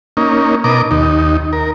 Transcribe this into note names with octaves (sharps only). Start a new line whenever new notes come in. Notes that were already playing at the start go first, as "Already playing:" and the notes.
A#3 C#4 D#4
B2 A#4 D#5 D6
D#2 D#4
A#4